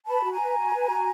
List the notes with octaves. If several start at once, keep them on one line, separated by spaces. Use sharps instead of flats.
B4 A5 B5
F#4
G#5 A#5
B4
F#4
B4
F#4